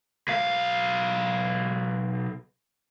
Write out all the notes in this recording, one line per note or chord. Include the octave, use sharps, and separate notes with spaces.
B1 F5